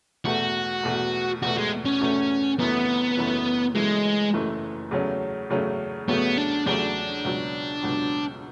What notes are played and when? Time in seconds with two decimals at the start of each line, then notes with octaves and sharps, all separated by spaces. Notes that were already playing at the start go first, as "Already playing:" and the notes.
0.25 E2 B2 A3 F#4
0.83 E2 B2 A3
1.42 E2 B2 A3 F#4
1.57 G#3
1.85 C#4
2.01 E2 B2 A3
2.59 F#1 F#2 E3 A3 B3
3.17 F#1 F#2 E3 A3
3.75 F#1 F#2 E3 G#3 A3
4.34 F#1 F#2 E3 A3
4.91 E2 C#3 F#3 A3 C#4
5.50 E2 C#3 F#3 A3 C#4
6.08 E2 C#3 F#3 A3 B3 C#4
6.38 D4
6.66 E2 C#3 F#3 A3 C#4 D4
7.24 C#2 B2 F#3
7.83 C#2 B2 F#3